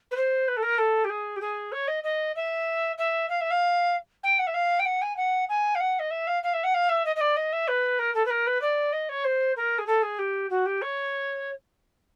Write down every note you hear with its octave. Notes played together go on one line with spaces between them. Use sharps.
B4
C5
B4
A4
A#4
A4
G4
G#4
G4
G#4
C#5
D#5
D#5
E5
E5
F5
E5
F5
G5
F#5
E5
F5
G5
F#5
G#5
F#5
G#5
F5
F#5
D#5
E5
F5
F5
E5
F#5
F5
E5
D#5
D#5
D5
D#5
E5
B4
A#4
A4
B4
A#4
B4
D5
D#5
C#5
C5
A#4
G#4
A4
G#4
G4
F#4
G4
C#5